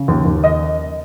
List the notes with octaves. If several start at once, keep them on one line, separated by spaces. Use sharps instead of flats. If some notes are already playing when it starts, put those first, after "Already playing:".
Already playing: C#3
D#2
D#2
D#5